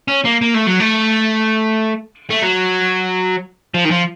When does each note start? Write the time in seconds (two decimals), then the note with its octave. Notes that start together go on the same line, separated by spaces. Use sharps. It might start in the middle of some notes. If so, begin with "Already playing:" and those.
0.08 C#4
0.25 A#3
0.41 A#3
0.54 A3
0.67 F#3
0.80 A3
2.30 A3
2.42 F#3
3.74 F3
3.85 D#3
3.91 F3